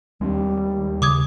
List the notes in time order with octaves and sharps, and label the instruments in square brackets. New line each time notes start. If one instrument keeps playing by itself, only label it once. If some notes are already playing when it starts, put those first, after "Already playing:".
[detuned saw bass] D#2 [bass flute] G3 [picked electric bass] G#3 C4 D4
[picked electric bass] C#3 [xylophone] D6 D#6 G#6